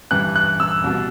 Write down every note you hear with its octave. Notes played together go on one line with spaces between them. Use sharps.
G2 E3 F#6
F#6
E6
C2 B2